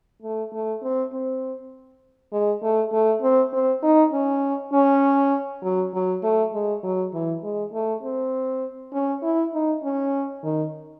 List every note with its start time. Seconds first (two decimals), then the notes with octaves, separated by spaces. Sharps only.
0.22 A3
0.52 A3
0.83 C4
1.13 C4
2.33 G#3
2.62 A3
2.93 A3
3.22 C4
3.53 C4
3.83 D#4
4.12 C#4
4.73 C#4
5.62 F#3
5.94 F#3
6.23 A3
6.54 G#3
6.83 F#3
7.14 E3
7.43 G#3
7.73 A3
8.03 C4
8.93 C#4
9.23 E4
9.54 D#4
9.83 C#4
10.43 D#3